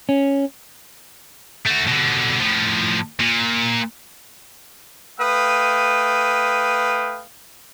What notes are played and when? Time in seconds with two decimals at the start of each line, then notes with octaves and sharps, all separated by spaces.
0.09 C#4
1.66 A3 F#4
1.87 B2 D3
2.40 A2 F3
3.20 A#2
5.19 A3 B4 F5 G5 D#6